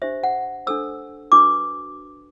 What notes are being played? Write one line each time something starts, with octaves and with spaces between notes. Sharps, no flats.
D4 G4 C5 E5
F#5
D4 A4 C5 E6
D4 F#4 B4 D6